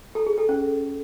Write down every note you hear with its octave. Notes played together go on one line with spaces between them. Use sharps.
A4
G#4
A4
C#4